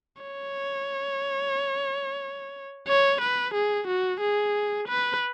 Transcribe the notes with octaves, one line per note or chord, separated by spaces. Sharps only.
C#5
C#5
B4
G#4
F#4
G#4
B4